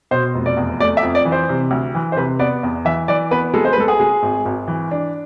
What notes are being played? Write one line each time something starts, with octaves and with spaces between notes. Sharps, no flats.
B2 C5
F1
D5
E2
A3 D5
E5
F2
D5
E3
C5
C3
D2
E3
C5
C3 B4
B3 D5
E2
E3 E5
E3 D5
B3 B4
G#3 A4
C5
B4
G#3 A4
G#4
G#3
G#1
G#1
E3
D4